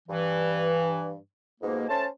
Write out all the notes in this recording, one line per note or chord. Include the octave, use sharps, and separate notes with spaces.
G2 E3
F2 G#2 B2 A#3
A3 C#4 C5 A5